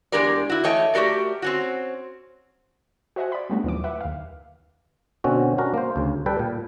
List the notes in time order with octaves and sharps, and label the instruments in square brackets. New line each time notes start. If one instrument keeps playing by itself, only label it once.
[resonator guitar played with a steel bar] E2 G#3 D4 G4 A#4 D5
E4 F#4
E3 A3 C#5 D#5 G5
A3 F#4 G4 A#4 D5
C4 C#4 F#4
[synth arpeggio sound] F#4 C5 D#5 E5 F#5 G#5
D5 B5
G3 A3 B3 C#4 D4 F#4
D#2 A#2 E3 F#3 D6
B4 E5 F#5
D#2 F5
[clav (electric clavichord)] B2 D3 C4 C#4 F#4
C#4 D4 F#4 A#4
A#3 C5
D2 C#3
G3 A4 B4 G5
A#2